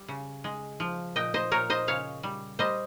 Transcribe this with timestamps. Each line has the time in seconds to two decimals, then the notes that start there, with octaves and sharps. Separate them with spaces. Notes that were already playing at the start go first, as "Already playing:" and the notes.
Already playing: G3
0.08 C#3
0.44 G#3
0.80 F3
1.16 A#2 D#5 G5
1.34 C5 D#5
1.52 A#2 A#4 C#5
1.70 C5 D#5
1.87 C#3 C#5 F5
2.23 G3
2.59 G3 C5 D#5